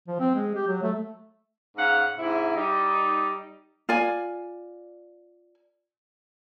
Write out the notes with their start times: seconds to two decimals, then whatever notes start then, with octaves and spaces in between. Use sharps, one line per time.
0.08 F3
0.20 C4
0.35 G#3
0.55 G4
0.68 F#3
0.83 A3
1.77 G#2 C#4 F5 F#5
2.17 G#2 C3 E4
2.55 G3 D#4
3.89 F4 D5 G#5